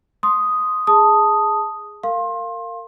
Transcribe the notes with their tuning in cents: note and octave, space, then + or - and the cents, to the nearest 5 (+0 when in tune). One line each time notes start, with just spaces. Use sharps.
C6 +0 D#6 +0
G#4 +0 A5 +0 D#6 +0
A#4 -25 F5 +0 C6 +25